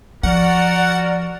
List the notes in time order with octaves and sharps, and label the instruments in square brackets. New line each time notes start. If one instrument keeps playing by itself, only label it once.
[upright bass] F3 [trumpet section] F#4 A#4 [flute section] D5 [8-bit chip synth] F#5